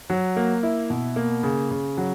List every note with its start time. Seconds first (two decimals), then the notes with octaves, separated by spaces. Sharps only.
0.10 F#3
0.36 A#3
0.63 E4
0.90 B2
1.16 A#3
1.43 C#3
1.71 C#3
1.97 F#3